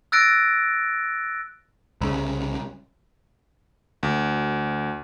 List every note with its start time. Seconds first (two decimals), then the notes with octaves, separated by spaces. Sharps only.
0.12 E6 F#6 A6 A#6 D7
2.01 C2 C#3
4.03 D2